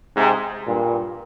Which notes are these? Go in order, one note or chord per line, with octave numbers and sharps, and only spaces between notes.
G#2 C3
G2 A#2